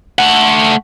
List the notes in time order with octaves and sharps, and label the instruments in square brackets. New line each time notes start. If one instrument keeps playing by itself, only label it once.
[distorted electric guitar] A3 F#5